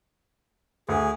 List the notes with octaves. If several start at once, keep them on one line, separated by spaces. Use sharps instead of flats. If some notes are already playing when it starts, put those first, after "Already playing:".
D2 G#4